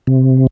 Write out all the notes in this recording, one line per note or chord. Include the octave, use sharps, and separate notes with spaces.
C3